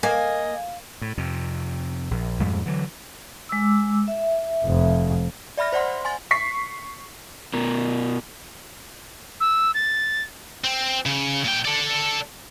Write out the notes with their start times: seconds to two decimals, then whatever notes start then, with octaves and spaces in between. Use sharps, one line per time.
0.03 A#3 D#5 G#5
1.02 A2
1.18 F2 C3
2.11 A#1
2.39 A#1 F2 G#2 G3
2.66 D3 E3 F#3
3.49 G#3 D6 E6
4.08 E5
4.64 F1 F2
5.57 D5 E5 B5 F6 A#6
5.73 C5 D5 F#5 C6
6.05 G#5 C6 A6
6.31 C#6 B6 C7
7.53 B2 A#4
9.40 E6
9.74 A6
10.64 C4
11.06 C#3
11.45 A#2 G5
11.65 A4 D5